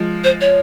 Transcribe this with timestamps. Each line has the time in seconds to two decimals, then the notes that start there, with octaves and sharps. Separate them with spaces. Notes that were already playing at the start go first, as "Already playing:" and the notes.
Already playing: F3 G#3
0.24 C5
0.41 C#5